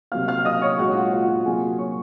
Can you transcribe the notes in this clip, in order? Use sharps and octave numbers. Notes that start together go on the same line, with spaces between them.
C3 F#3 A#3 F5 F6
F5 F6
D#5 D#6
C#5 C#6
A#2 G#3 F#4 F#5
F4 F5
F4 F5
F#4 F#5
C3 F#3 A#3 G#4 G#5
C#5 C#6